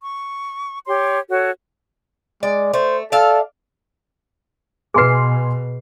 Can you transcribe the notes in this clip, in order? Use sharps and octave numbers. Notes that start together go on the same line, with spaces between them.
C#6
G4 C#5 C6
F#4 A4 C#5
G#3 D5
A3 C5
A4 D5 E5 F5
B2 G#4 B4 G#5 C6 C7